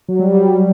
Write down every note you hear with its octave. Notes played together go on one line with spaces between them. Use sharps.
F#3
G3
G3